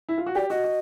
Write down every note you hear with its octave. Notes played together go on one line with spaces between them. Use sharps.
E4
F4
F#4
G4 D5
F#4 D#5
F#4